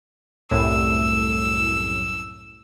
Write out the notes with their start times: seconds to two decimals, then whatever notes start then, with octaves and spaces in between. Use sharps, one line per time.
0.51 C2 F#2 A2 E6